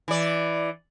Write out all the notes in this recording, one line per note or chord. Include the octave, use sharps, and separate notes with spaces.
E3 D5